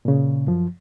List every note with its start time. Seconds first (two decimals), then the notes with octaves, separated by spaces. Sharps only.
0.05 A#2 C#3
0.47 F#2 F3